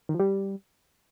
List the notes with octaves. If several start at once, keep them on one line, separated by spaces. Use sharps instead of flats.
D#3
F3
G3